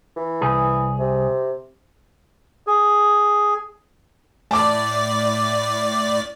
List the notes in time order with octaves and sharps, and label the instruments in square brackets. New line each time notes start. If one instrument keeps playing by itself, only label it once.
[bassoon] E3
[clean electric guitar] C2 G#4
[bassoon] C3
[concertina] G#4
[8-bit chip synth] A2 D5 [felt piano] A5 D6